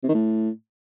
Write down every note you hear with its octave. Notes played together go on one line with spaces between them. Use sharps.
C3
D#3
A2